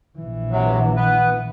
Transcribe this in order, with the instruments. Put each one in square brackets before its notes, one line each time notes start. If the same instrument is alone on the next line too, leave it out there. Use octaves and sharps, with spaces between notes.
[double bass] A#1 E3
[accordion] C3 F#3
B3 B4